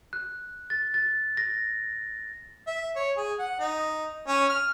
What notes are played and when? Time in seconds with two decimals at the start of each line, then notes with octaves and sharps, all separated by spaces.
0.13 F#6
0.70 A6
0.94 A6
1.37 A#6
2.67 E5
2.96 C#5
3.17 G#4
3.39 F#5
3.60 D#4
4.27 C#4
4.49 F6